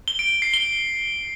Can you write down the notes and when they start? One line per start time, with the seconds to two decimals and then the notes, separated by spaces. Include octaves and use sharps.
0.08 G7
0.19 D7
0.31 D7
0.42 C7
0.54 G7